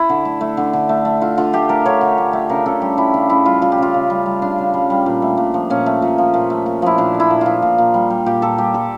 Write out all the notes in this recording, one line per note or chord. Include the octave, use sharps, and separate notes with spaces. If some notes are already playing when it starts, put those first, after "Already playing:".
Already playing: E4
D3
A3
A3
D3
D3
A3
A3
D3 F4
D3 F4
A3 G4
A3 A#4
D3 C#5
D3
A3
A3
C#3 A#4
C#3 A4
G3 G4
G3 E4
C#3 D4
C#3 E4
G3 F4
G3 F4
G4
C#3 F4
C#3
G3
G3
C#3 D4
C#3
G3
G3
A#2
A3
A#2
F3
A#2 C#4
A3
A#2
F3
A#2
A3
A#2
F3 E4
A#2 D4
A3
E4
A#2
F3 F4
A#2
A#2
G3
G3
A#2 G4
A#2 A4
G3 G4
G3 A4